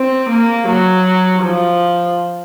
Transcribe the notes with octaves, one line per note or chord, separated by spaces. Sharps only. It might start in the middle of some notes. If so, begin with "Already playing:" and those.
Already playing: C4
A#3
F#3
F3